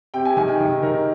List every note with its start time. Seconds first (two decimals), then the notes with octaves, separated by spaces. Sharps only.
0.14 C3 G5
0.25 G#5
0.36 D#3 G#5
0.48 G5
0.60 D#3
0.82 D#3 A#4